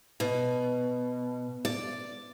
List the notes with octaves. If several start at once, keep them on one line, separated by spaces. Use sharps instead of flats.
B2
D5